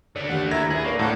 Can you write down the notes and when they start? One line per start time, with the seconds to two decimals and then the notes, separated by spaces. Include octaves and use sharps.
0.16 D3 A3 D5
0.29 D#2 F#5
0.51 E4 A#4 E5 G#6 A#6
0.70 G#4 B4 G#6 F#7
0.84 A#3 A#4 D5 C#6
0.99 A2 A#3 D4 A4 F#5